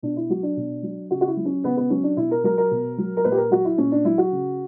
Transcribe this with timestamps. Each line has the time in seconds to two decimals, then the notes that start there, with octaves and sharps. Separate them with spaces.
0.02 B2 D4
0.16 E4
0.30 F#3 F#4
0.43 D4
0.57 B2
0.83 F#3
1.11 C#3 F#4
1.21 F#4
1.27 E4
1.37 F#3
1.45 C#4
1.64 C#3 B3
1.77 B3
1.90 F#3 C#4
2.03 D4
2.17 B2 E4
2.31 A#4
2.44 F#3 A#4
2.58 A#4
2.71 B2
2.98 F#3
3.17 A#4
3.25 A#2 B4
3.32 G4
3.37 A#4
3.51 F#3 F#4
3.65 E4
3.78 A#2 C#4
3.92 D4
4.05 F#3 E4
4.18 F#4
4.32 C#3